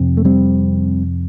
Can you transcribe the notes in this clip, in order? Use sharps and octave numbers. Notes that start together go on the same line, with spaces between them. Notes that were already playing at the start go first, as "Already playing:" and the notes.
Already playing: F2 C3
A3
G3 C4